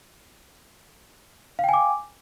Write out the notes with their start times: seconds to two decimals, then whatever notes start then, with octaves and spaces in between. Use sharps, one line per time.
1.59 F5
1.64 G5
1.69 G#5
1.74 D6